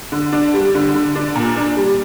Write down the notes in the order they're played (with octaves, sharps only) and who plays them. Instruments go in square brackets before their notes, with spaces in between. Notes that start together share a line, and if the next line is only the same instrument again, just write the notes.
[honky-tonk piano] D3
D4
G3
D3
D3
D4
A#2
D4
G3